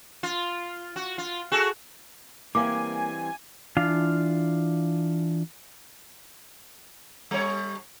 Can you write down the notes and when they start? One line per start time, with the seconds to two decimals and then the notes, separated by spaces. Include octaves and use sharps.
0.23 F4
0.96 F#4
1.18 F4
1.52 F#4 G#4 A4
2.55 E3 G3 A#3 C4 E5 F5 G#5 D6
3.77 E3 D4 F4 F5
7.31 G3 C#5